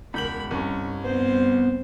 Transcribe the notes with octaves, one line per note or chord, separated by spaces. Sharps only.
E1 C#2 A#4 B5 G6 F#7
C2 G2 C#4
B3 C4 C5